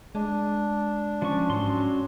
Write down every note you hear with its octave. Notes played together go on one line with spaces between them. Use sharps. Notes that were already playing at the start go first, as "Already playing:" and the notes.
G#3 D4
F3 C#4 C#6
G#2 F#3 C#4 C6